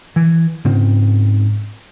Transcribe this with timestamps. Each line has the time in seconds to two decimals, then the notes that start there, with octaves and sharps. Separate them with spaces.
0.16 E3
0.65 G#2 C#3 C4